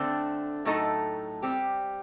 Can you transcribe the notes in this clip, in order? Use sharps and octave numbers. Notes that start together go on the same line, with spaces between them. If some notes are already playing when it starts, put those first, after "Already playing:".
Already playing: D3 A3 C4
A2 F#3 A3 D#4 A4
G3 C4 G4